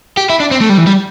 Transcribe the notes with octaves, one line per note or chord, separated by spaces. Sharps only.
G4
E4
D4
C4
A3
G3
E3
G3